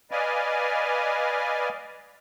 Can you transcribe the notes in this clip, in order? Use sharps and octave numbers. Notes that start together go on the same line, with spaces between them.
B4 D5 D#5 F5 G#5